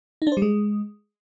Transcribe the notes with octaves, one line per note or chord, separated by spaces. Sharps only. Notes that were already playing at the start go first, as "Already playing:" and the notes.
D#4
D4
C5
G3
G#3